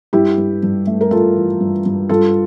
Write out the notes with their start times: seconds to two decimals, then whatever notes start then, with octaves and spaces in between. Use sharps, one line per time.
0.13 G2 E4 G4
0.38 G2
0.63 G2
0.87 A3
1.01 A#4
1.11 A3 F4 A4
1.36 E3
1.61 G2
1.86 G2
2.09 G2 F4 A4